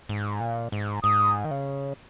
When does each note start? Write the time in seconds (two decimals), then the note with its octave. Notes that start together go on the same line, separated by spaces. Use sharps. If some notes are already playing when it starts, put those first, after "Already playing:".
0.09 G#2
0.40 A#2
0.72 G#2
1.03 G#2 D#6
1.44 D#3
1.51 C#3